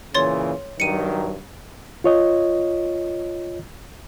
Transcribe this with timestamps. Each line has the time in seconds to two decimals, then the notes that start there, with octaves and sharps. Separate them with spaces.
0.15 A#2 C#3 E3 C#5 C6 A6
0.80 G2 D#3 F#3 C#7 D#7
2.04 F4 C#5 D#5